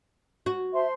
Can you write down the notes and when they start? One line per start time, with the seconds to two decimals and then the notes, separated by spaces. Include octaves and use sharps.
0.46 F#4
0.73 C5 E5 A5 C6